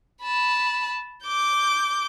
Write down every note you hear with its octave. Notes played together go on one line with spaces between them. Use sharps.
A5 B5
D6 G6